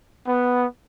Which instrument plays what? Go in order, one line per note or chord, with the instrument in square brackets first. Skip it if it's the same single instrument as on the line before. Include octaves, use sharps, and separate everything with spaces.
[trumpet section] B3